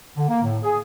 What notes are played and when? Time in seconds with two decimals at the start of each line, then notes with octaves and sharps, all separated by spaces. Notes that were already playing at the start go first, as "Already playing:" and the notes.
0.17 D3
0.29 A#3
0.44 A2
0.63 G#4